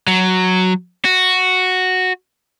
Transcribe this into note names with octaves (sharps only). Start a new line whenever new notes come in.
F#3
F#4